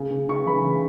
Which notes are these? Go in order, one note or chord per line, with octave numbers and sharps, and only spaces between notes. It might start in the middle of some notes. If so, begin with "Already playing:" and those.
Already playing: C#3
C#3
C#3 C#6
E3 B5
C#3